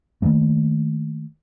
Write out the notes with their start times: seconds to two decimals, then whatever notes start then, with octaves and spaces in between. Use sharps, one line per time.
0.22 D#3 F3 A3 A#3